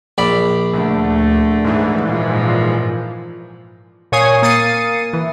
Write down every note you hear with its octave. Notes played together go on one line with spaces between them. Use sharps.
A#1 D5 B5
D2 D3 A3
G#2 E3
A#2 F3
A#2 C#5 G#5 D#6 C7
A#3 D#6 A6 C7 C#7 D#7
E3